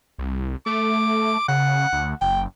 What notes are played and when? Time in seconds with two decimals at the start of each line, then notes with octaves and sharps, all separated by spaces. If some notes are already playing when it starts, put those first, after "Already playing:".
0.18 C2
0.66 A3 D6
1.48 C#3 F#5
1.92 D2
2.21 F#1 G5